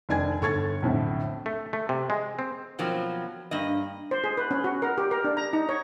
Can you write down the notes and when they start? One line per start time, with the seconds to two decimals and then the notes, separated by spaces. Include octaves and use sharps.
0.09 F1 D#3 D4 G#5 G#6
0.41 G1 A4 C#6 G#6 A6
0.82 B1 F2 A2 D3
1.46 A3
1.73 A3
1.89 C3
2.10 G#3
2.39 C4
2.79 B2 F3 F#3 A#3 C4
3.51 G2 A#3 D#5
4.11 C5
4.24 G#4
4.37 B4
4.51 C#4
4.64 F#4
4.82 A#4
4.98 G4
5.11 A#4
5.24 D4
5.37 A#5
5.53 D#4
5.69 C#5